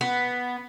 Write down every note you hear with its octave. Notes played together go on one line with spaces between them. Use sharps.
B3